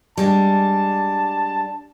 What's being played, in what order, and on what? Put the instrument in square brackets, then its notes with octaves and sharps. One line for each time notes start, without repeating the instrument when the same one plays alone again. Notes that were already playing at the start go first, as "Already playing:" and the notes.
[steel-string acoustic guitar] G3 G#3 D4 [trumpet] A5